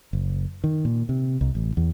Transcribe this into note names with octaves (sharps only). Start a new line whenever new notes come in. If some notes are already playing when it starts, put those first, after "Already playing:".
F#1
D#3
A#2
C3
C2
A1
E2